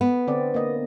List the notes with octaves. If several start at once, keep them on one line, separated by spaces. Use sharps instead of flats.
B3
D3 C4 D5
A#3 D#5